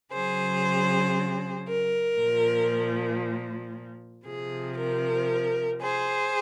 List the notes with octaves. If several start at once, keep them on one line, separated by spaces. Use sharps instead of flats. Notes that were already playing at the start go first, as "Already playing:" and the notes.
C#3 F#3 G#4 C5
A#4
A#2 F3
C3 F3 G#4
A#4
G#4 C5